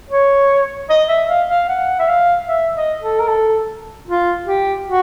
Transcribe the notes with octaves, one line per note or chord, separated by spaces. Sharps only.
C#5
D#5
E5
F5
F5
F#5
E5
F5
E5
D#5
A4
A#4
A4
F4
G4
F#4